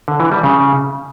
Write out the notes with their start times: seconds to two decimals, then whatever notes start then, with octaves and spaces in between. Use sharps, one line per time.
0.08 D3
0.20 E3
0.32 G3
0.43 C#3